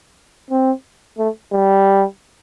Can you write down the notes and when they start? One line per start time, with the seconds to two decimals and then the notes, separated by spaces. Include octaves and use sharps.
0.51 C4
1.18 A3
1.52 G3